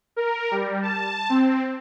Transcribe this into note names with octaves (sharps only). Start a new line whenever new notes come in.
A#4
G3
A5
C4